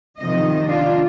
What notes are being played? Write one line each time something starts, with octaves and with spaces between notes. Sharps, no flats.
C3 D#3 F3 D#5
D4 F4